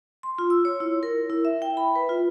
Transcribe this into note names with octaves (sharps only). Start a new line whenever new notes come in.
C6
F4
E6
C#5
E4
A#4
E4
E5
G5
B5
B4
F4